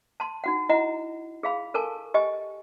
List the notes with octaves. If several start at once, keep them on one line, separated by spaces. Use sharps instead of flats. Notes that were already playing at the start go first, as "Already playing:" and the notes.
A5 C6
D#4 F#4 F#5
E4 D#5 F#5 A#5
G#4 F5 B5
A4 A#4 G#5 A5 C#6
G4 D#5 G#5